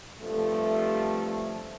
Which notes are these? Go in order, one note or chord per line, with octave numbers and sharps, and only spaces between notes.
G2 C3 F3 A3